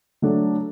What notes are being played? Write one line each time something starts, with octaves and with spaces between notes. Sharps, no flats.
F#3 A3 D4 A4